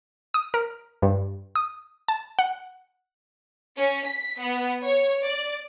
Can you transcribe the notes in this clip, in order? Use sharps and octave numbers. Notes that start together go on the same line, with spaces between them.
D#6
A#4
G2
D#6
A5
F#5
C#4
B6
B3
C#5
D5